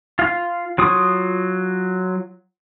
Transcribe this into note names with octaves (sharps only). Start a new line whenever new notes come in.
F4 F5
F#3 F4 D#6